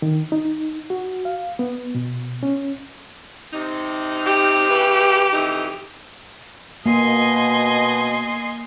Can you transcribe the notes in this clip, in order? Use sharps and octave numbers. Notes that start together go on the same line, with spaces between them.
D#3
D#4
F#4
F5
B3
B2
C#4
C3 D#4
G4
C#3 E3 B4
F2 E3 D#4
B2 A#3 D#5 G#5 C6